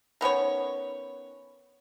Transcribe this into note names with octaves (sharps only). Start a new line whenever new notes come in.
D#3 B3 C#4 C#5